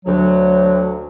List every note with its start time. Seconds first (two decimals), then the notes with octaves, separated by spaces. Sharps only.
0.06 D2 F#3